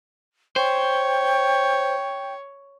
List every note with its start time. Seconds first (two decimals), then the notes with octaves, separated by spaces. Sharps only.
0.56 C5 C#5 G5